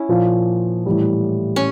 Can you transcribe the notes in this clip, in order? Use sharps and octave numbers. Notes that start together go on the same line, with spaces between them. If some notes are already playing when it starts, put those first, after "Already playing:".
Already playing: C#4 E4
A#2 F3 A#3
A2 E3 G3
C#4